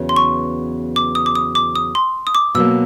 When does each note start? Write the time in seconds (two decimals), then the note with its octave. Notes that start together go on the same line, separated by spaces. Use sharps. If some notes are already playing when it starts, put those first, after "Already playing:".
Already playing: E2 C#3 F#3 B3
0.09 C6
0.16 C#6
0.96 D6
1.15 D#6
1.26 D6
1.35 D#6
1.55 D6
1.76 D#6
1.95 C6
2.27 D#6
2.35 D6
2.55 B2 F#3 A#3 E6